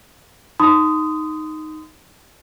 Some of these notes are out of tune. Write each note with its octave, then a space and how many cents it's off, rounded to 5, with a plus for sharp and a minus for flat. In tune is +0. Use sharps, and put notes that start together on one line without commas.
D#4 +0 C6 -30 D#6 +0